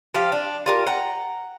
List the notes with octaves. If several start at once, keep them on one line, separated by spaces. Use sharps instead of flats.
F3 G4 F5
D4
F4 G4 A#4
F#5 G5 A#5